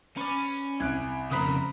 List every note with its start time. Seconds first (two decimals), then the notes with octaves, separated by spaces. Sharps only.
0.17 C#4 B4 D5
0.80 C2 G#5 F#6 D7
1.31 F2 C#3 A#4 C5 B5 D#6 F#6